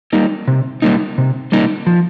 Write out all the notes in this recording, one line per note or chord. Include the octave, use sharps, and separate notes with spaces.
G3 A#3 D#4
C3
G3 A#3 D#4
C3
G3 A#3 D#4
F3